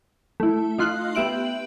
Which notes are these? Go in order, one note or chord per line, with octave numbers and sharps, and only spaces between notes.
A3 E4
D#4 F4 C6 F#6
B3 G4 E5 D7 F#7